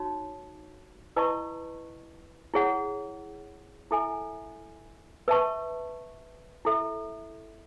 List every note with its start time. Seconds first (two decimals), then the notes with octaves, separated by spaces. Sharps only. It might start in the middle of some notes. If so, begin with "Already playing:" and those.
Already playing: D#4 F#4 C#5
1.16 E4 B4 D#5 A5 C#6
2.54 E4 G#4 C#5 F#5
3.91 E4 A4 E5 G#5
5.28 B4 E5 A5 C#6
6.65 E4 A4 E5